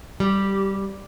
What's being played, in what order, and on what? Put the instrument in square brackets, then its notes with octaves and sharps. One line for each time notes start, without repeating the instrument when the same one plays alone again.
[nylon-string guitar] G3 [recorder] G4